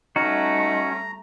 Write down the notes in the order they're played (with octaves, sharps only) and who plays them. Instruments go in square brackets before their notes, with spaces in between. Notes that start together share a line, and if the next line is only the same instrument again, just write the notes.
[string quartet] G3 A3 [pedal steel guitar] C#4 F#4 [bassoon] D#4 [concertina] A#5